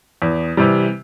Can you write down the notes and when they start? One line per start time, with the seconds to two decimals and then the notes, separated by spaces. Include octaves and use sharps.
0.22 E2
0.57 C3 E3 G3